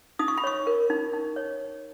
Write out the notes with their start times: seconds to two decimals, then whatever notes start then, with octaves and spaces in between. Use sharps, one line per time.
0.19 D#4 D#6
0.28 C#6
0.38 B5
0.44 C#5 C#6
0.67 A#4
0.90 D#4
1.13 D#4
1.36 C#5